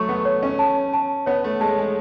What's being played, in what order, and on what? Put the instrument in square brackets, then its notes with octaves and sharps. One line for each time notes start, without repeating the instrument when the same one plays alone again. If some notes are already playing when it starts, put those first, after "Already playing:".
Already playing: [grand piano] F#3 A3 [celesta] C#6
[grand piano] B3
[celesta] C#5
[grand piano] C#4
[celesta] A5
A5
[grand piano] B3 [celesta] C#5
[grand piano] A3
[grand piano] G#3 [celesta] A5
[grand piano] G#3